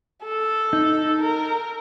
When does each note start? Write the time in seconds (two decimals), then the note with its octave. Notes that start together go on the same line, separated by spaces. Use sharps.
0.25 A4
0.73 D#4
1.21 A#4